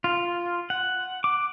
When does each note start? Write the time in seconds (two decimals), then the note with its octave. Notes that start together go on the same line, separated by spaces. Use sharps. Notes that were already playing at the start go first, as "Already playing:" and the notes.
0.04 F4
0.70 F#5
1.24 D6